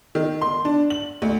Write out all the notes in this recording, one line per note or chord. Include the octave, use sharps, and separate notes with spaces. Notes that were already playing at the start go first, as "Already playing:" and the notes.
D#3
C6
D4
F#7
D2